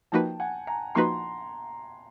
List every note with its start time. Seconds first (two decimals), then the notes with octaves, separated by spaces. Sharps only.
0.12 F3 A#3 D#4 F#4 B4 G5 A5
0.40 F#5 G#5
0.67 G#5 A#5
0.95 F3 A#3 D#4 F#4 B4 A#5 C6